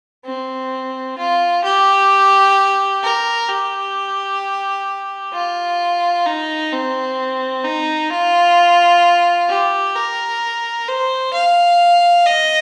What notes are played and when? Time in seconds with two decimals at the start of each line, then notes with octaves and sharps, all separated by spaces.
0.26 C4
1.18 F4
1.65 G4
3.03 A#4
3.49 G4
5.34 F4
6.26 D#4
6.72 C4
7.64 D#4
8.11 F4
9.49 G4
9.95 A#4
10.88 C5
11.34 F5
12.26 D#5